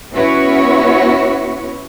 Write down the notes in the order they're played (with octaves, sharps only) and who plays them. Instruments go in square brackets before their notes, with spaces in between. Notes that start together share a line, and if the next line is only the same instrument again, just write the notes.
[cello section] B3 C#4 E4 F#4 B4 C#5